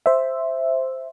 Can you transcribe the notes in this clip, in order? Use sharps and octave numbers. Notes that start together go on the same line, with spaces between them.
C5 E5